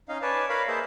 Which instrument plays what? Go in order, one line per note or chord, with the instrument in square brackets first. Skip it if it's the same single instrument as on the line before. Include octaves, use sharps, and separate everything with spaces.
[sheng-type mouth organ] C#4 D#4 D#5 F5
B4 C#5 D5 G#5 A5
A#4 B4 C#5 F5 B5
A#3 G#4 C5 D#5 E5 A5